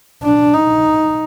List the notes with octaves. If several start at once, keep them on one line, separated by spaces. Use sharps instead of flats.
D4
D#4